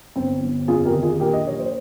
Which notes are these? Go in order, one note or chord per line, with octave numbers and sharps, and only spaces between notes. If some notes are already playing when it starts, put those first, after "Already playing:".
G1 C4
G1
F2 F4 G#4
G4 A#4
D#3
F4 G#4
A#1 G4 A#4
D#5
A#1 C#5
C5